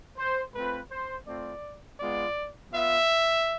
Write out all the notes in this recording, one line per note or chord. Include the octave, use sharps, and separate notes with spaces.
C5
A3 C4 F4 B4
C5
A3 C4 F4 D5
G#3 B3 F4 D5
B3 F4 E5